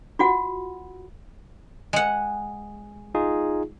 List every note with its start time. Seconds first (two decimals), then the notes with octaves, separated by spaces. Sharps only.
0.19 F4 F#4 F#5
1.93 G#3 F#5
3.15 D#4 F4 G#4